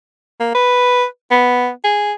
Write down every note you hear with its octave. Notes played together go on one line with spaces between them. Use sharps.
A#3
B4
B3
G#4